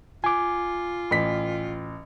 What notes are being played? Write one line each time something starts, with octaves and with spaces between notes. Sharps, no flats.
F4 G#5 D6
A1 B6